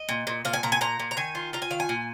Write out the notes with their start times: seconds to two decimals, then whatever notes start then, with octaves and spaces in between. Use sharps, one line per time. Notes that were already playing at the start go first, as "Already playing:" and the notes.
Already playing: D#5
0.09 A#2
0.27 A#2
0.45 A#2 F5
0.53 G#5
0.63 A#2 A#5
0.72 G#5
0.81 A#2 A#5
0.99 A#2
1.11 A#5
1.17 D#3 G#5
1.35 F4
1.53 F4 A#5
1.62 G#5
1.70 D#3 F5
1.80 G#5
1.89 A#2